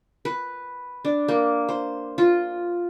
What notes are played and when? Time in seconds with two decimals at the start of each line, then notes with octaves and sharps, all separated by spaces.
0.25 B4
1.05 D4
1.28 A#3
1.69 C5
2.18 F4